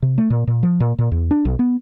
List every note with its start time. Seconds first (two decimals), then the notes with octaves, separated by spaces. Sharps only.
0.02 C3
0.18 A3
0.30 A#2
0.47 A#2
0.63 F3
0.80 A#2
0.99 A#2
1.12 E2
1.31 D4
1.45 B1
1.59 B3